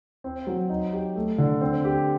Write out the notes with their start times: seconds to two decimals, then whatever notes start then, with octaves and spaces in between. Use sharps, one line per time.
0.24 C4
0.47 F#3
0.69 D#4
0.93 G4
1.16 A3
1.38 D3
1.61 C4
1.85 G4